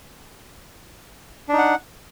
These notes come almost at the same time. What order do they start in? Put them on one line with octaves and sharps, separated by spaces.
D4 D#4 F#5